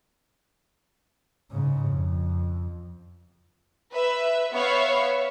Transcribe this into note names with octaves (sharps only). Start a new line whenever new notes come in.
G#2 C#3
F2
B4 E5
B3 C#5 E5 F5